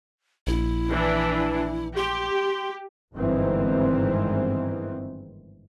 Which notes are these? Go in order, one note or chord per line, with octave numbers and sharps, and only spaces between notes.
A#1 E4
E3 D4
G4 C6
G1 G#2 D#3 E3 C4